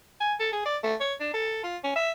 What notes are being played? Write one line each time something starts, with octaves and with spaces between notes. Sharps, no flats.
G#5
A4
G#4
D5
A3
C#5
D4
A4
F4
C#4
E5